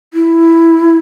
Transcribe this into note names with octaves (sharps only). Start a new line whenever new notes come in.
E4